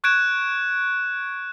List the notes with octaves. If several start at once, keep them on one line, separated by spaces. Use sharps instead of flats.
C#6 F#6 G#6 D7 E7